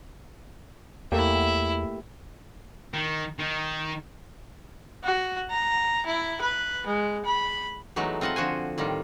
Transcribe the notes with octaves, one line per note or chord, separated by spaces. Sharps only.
E2 A3 A#3 E4 G4 E5
D#3
D#3
F#4
A#5
E4
B4
G#3
B5
E3 F#3 G#3 A3 B3 D#4
C4 F4 D#5 F#5 A5
D3 F3 F#4 C5 G#5
A2 D#3 G3 F4